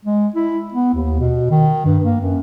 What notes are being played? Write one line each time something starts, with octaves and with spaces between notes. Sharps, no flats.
G#3
E4
B3
D#2
B2
D#3
G2
A#3
F#2